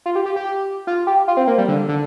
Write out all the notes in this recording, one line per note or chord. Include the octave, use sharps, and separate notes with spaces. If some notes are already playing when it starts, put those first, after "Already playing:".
F4
G4
G4
G4
F4
G4
F4
C4
A#3
G3
D3
D3